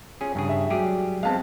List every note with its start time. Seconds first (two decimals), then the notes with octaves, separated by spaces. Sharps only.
0.21 C#4 F4 G#4
0.35 G2 C#3 G#4
0.49 E5
0.70 F#3 G3 G4 G#4
1.23 G#3 B3 C4 F5 A5